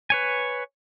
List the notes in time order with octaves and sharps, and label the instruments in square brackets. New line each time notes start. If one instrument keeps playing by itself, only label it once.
[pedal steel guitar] B4 C#5 G#5